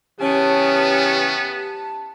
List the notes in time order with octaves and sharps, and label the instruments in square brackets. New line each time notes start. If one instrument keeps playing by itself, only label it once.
[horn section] C#3 E3 C#4 [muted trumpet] B3 [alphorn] G4 [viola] A5